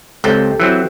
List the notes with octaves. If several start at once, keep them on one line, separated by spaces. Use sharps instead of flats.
C#2 C4 G4 A4
E3 F#3 C4